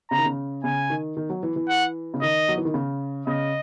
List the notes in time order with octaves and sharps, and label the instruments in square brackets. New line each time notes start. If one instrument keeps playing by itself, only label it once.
[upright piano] C#3 [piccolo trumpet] A#5
[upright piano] D#3
C#3
[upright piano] C#3 [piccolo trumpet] G#5
[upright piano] D#3
D#3
F#3
E3
E3
[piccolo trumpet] F#5
[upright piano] C#3
[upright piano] D#3 [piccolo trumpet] D#5
[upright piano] F#3
E3
D#3
C#3
[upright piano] C#3 [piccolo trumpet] D#5